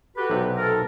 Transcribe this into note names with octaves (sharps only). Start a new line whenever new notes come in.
F#4 G4 A4 B4
B1 C3 C4
A4 A#4